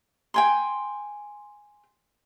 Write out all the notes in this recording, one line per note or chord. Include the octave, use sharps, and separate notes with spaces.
G5 G#5 C6